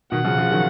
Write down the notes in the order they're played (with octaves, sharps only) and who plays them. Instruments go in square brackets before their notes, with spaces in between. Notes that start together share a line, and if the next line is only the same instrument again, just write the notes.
[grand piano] B2 D#3 [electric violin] F#5
[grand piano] C#3 F3
C#3 F3
D#3 F#3